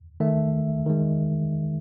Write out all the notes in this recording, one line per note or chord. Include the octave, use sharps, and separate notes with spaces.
D#3 A3 E5
D#3 G#3